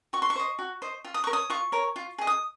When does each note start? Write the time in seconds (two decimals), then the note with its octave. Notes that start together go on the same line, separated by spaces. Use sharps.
0.13 F#4 C#6
0.22 C6
0.30 C#6
0.36 C5 D#5
0.59 F#4
0.82 C5 D#5
1.05 F4
1.14 D#6
1.24 A#4 C#6
1.31 C#5 D#6
1.50 F4 C#6
1.72 A#4 C#5
1.96 F4
2.18 G#4 D#5
2.27 D#6